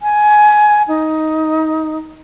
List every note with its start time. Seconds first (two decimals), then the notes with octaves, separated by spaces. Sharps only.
0.02 G#5
0.88 D#4